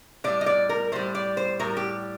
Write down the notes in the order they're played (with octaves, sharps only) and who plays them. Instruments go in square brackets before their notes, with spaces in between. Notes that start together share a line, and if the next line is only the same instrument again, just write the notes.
[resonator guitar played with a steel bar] A2 G3 D5
D#5
D5
A#4
A2 G3 C5
D5
C5
A2 G3 A#4
G4